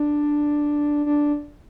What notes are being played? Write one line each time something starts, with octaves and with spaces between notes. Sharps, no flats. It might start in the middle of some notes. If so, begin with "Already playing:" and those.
Already playing: D4
D4